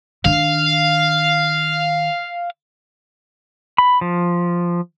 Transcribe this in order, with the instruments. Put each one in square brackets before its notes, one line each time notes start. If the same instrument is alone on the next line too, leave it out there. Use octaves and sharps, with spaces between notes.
[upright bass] D#3 D4 [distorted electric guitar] F5
[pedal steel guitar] B5
F3